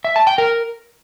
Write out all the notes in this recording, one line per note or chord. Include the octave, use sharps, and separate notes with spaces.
E5
A5
G5
A#4